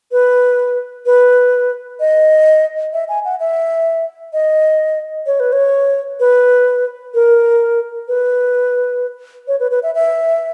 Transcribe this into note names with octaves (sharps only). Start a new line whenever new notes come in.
B4
B4
D#5
E5
G#5
F#5
E5
D#5
C#5
B4
C#5
B4
A#4
B4
C#5
B4
B4
E5
E5